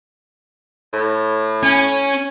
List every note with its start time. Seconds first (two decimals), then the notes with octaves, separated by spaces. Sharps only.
0.93 A2
1.63 C#4 G#5